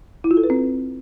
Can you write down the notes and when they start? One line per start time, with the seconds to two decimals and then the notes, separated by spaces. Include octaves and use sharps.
0.24 E4
0.31 F4
0.37 A4
0.44 B4
0.50 C4